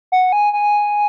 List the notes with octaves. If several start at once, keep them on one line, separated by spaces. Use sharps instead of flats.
F#5
G#5
G#5